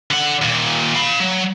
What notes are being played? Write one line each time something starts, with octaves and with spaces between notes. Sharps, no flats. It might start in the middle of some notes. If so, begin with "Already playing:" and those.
D3 F#5
D#2 A#2
F5 B5
F#3